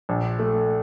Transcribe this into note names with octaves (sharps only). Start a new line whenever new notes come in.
A#1
A3